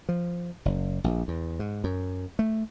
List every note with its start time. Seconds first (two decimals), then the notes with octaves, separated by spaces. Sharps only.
0.09 F3
0.65 F#1
1.04 A#1
1.28 E2
1.59 G#2
1.84 F#2
2.39 A3